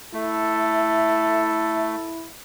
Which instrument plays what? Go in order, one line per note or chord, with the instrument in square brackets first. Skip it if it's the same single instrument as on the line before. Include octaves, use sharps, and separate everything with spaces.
[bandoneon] A3 [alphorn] E4 [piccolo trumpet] A4 [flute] E5